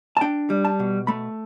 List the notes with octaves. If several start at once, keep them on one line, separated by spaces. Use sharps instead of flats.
A5
D4 G5
G3
A5
B2
A3 B5